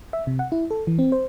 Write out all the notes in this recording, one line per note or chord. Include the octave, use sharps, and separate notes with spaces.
E5
C3
F#5
E4
A4
E3
C4
C5